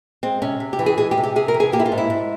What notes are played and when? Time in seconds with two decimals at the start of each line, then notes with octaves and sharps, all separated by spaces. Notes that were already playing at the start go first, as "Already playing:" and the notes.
0.23 G#3 C4
0.42 C3 C#4
0.60 C3
0.73 G4
0.79 E3
0.86 G#4
0.98 G#3 G#4
1.11 G4
1.18 C3
1.23 G4
1.36 C3 G#4
1.48 A#4
1.54 E3
1.60 G#4
1.72 A#3 G4
1.80 E4
1.86 F4
1.92 G#2
1.98 E4
2.10 G#2